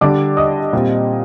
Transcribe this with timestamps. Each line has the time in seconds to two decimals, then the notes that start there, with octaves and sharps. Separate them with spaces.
0.01 D3 G3 D4 D5 D6
0.37 D#5 D#6
0.73 A#2 G3 C4